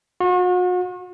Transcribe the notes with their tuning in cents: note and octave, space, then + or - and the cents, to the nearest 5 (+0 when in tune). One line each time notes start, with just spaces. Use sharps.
F#4 -40